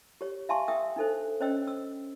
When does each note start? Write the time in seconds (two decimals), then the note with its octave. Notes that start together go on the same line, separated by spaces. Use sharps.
0.21 G4 C#5
0.49 E5 F5 G#5 A5 C6 C#6
0.68 E5 G5 D#6 E6
0.96 D4 D#4 A4 C5
1.40 C#4 C5 C#5 D#5 G5 E6
1.68 E6